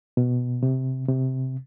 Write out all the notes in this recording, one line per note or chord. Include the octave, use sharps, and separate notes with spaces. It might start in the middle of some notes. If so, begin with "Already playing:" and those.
B2
C3
C3